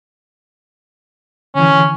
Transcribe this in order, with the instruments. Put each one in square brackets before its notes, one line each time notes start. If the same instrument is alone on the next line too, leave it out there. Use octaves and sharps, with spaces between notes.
[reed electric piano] D3 E3 [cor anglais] C#4